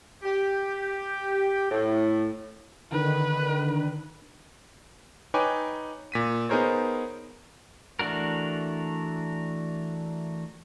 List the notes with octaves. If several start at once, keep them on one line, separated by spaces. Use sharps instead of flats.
G4
A2
D3 D#3 B4
D#4 B4 C#5 G5 G#5 D6
A#2 B6 D#7
B3 D#4 G#4 A#4 C5 C#5
E3 A3 D4 F#4 A#4